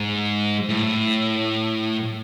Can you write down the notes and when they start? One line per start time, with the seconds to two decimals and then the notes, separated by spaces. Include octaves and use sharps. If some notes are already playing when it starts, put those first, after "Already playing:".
Already playing: G#2
0.69 A2